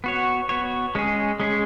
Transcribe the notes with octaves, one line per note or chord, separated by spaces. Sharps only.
B3 F#4 C#5
B3 F#4 C#5
G#3 C#4 G#4
G#3 C#4 G#4